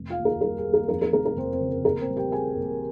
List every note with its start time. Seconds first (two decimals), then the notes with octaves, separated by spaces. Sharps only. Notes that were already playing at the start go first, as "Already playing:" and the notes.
Already playing: F1
0.10 F4 F5
0.17 D#2
0.25 A#4
0.41 G3 A#4
0.58 G#4
0.66 D#2
0.74 A#4
0.89 F2 A#4
1.02 A#4
1.13 F1 A#4
1.26 A#4
1.37 F1 C4 C5
1.53 C4 C5
1.61 C#3
1.85 A#1 A#4
2.01 C4 C5
2.08 G3
2.16 G4 G5
2.32 C4 G#4 G#5
2.56 A#1